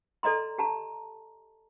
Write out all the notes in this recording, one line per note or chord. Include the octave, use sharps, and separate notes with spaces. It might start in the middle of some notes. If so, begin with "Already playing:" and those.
A4 D5 D#5 A#5 C6
G4 A5 A#5